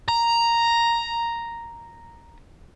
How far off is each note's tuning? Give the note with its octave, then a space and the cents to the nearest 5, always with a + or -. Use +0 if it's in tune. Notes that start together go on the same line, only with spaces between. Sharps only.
A#5 +0